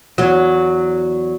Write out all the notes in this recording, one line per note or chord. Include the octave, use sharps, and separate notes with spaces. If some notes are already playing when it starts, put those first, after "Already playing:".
E2 F#3